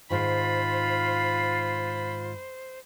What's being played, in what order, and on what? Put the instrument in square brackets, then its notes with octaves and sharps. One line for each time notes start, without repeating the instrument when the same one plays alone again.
[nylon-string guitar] G#2 D#3 [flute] F4 [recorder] C5 [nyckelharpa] B5